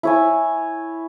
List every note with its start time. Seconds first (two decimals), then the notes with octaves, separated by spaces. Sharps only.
0.03 E4 C#5 G#5